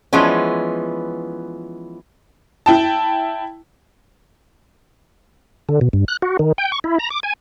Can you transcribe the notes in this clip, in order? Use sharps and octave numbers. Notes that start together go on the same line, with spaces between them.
E3 F3 G#3 B3 C#4
E4 G5 A5
D3
B2
G2
F#6
F#4
D#3
G5
C#6
E4
A#5
D6
G#5